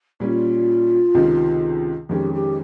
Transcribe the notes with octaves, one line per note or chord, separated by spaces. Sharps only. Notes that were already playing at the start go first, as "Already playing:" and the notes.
A#2 G3 C#4 F4
C#2 C3 D#3
F2 D#3 G#3 C#4 G4
G4